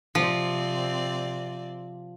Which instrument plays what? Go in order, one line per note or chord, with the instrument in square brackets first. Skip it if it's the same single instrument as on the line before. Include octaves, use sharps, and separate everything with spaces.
[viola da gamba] C3 C4 D5 [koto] F3